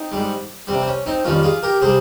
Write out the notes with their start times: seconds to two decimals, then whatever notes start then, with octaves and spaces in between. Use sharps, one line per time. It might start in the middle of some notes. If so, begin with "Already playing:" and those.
Already playing: C4 D#4
0.12 G#2 G3
0.67 C3 G3 C4
0.82 C4
0.88 C#4
1.06 C4 D#4
1.24 F2 D#3 G3 C#4 F4
1.43 F4 G#4
1.63 G4 A#4
1.81 C3 G3 G#4 C5